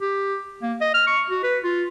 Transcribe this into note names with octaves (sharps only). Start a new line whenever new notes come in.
G4
A#3
D#5
F6
C#6
F#4
B4
F4